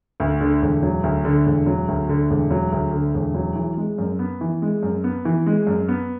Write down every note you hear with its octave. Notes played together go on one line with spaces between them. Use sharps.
D2
D3
E1
F#3
D2
D3
E1
F#3
D2
D3
E1
F#3
D2
D3
E1
F#3
E3
G#3
F#2
B3
E3
G#3
F#2
B3
E3
G#3
F#2
B3